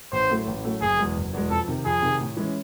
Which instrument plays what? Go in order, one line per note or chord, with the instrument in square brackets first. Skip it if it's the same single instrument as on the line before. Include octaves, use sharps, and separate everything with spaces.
[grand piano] A1 [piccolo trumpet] C5
[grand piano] A2 F#3 A3
A1
A2 F#3 A3
[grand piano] F#1 [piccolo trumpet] G#4
[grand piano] E2 B2 G#3
F#1
E2 B2 G#3
[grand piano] F2 [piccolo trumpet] A4
[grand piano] C3 D#3
[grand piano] F2 [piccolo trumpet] G#4
[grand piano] C3 D#3
A2
E3 G#3 C#4